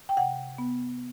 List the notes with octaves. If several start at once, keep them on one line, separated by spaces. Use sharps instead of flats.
G5
C3 F#5
B3